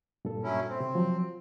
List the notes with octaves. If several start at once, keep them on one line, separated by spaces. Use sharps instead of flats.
G2 A#2 A4
F#3 C#4 E4
C4
C3
F3 F#3